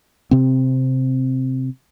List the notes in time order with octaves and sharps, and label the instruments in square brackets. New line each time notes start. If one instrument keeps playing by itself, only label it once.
[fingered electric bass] C3 C4